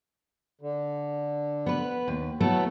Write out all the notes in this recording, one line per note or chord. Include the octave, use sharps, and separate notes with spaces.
D3
B3 B4
D#2
F#3 A3 B3 E4 A4